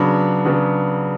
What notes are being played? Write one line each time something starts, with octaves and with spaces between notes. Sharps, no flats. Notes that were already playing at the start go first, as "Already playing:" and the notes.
Already playing: C#3 F#3 B3 D4 B5
C#3 F#3 B3 D4